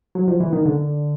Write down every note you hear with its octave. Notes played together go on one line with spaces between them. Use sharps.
F#3
F3
E3
D#3
D3